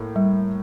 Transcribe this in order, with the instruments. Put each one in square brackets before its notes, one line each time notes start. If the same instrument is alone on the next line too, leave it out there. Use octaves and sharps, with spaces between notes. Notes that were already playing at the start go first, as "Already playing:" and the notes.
Already playing: [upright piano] A2 A#3
[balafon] G3